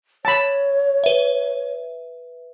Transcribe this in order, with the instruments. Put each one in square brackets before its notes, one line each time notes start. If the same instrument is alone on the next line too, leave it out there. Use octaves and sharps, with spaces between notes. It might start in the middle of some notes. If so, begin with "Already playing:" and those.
[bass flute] C#5 [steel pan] A5 B5
[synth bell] B4 E5